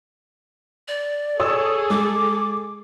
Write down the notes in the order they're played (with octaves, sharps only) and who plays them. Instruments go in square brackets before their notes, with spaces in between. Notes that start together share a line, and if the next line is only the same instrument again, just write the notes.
[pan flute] D5
[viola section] G#4 A4 [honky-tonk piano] C#5 D#6 E6
[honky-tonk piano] G#3 [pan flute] D6